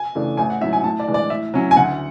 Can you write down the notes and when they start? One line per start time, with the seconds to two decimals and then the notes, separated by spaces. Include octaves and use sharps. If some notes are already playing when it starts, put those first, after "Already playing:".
Already playing: G#5
0.15 C#3 E3 A3 D4
0.37 A1 G#5
0.50 F#5
0.61 G#2 F#3 C#4 E4 E5
0.73 G#5
0.84 A2 A5
1.00 D5
1.08 E3 G#3 D4
1.14 D5
1.30 A2 E5
1.54 F#3 C#4 E4
1.71 G#5
1.76 D2 F#5